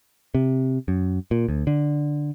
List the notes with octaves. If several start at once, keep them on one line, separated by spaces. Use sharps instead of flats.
C3
F#2
A#2
D2
D3